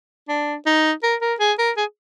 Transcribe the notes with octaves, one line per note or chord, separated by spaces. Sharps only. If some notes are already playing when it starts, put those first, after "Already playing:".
D4
D#4
A#4
A#4
G#4
A#4
G#4